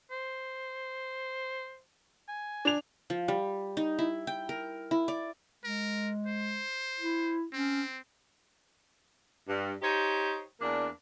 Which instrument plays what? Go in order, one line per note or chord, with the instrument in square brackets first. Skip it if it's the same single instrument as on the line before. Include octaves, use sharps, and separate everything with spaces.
[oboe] C5
G#5
[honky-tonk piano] D4 F7
[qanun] F3
G3
D#4
E4
G5
A#4
E4
D5
[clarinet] G#3 [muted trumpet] A#4
[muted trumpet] C5
[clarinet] E4
[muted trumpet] C4 [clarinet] C#4
[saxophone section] G2
D#4 G4 C5 C#5
E2 A#3 D4